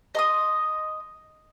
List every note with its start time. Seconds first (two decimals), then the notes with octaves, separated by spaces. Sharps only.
0.15 D#5 C6 D#6